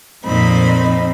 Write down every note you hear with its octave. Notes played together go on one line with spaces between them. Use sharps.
F2 A#2 F3 C4 D#4 B5